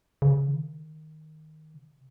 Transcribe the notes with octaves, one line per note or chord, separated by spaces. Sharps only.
C#3
D#3
C3